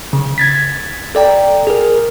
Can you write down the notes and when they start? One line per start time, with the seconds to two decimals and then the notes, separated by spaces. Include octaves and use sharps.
0.13 C#3
0.38 G#6 A6 B6
1.15 A4 D5 G5 A#5
1.67 G#4 A#4